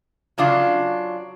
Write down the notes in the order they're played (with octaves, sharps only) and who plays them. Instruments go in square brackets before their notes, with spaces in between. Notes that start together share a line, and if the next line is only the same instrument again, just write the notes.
[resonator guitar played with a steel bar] C#3 F#3 D4 F4